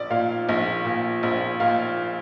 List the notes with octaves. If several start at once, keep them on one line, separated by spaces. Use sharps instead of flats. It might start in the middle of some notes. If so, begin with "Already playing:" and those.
Already playing: A#1 D5
A#2 F5
A#1
A#2
A#1
A#2 F5